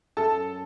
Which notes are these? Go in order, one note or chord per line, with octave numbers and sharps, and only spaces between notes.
F#2 A4 A5